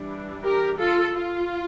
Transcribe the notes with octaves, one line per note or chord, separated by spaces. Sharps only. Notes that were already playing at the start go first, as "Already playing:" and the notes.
Already playing: E3 G3 D4
G4 A#4
F4 A4
F4